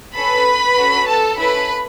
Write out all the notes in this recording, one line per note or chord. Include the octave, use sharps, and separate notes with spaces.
C#4 A4 B4 B5
C#4 F#4 A4
A4 A5
C#4 E4 A4 B4 B5